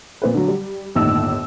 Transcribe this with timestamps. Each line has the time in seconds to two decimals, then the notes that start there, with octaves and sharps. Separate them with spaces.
0.22 A#2 C4 B4
0.34 D3 F#3
0.48 G3
0.95 G1 D#2 A2 D#4 E6